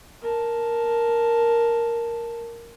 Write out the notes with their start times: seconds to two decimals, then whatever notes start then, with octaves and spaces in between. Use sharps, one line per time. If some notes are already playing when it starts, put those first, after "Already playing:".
0.22 A#4 A5